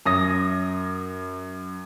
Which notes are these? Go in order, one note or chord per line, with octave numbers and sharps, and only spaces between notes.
F#2 D#6 A#6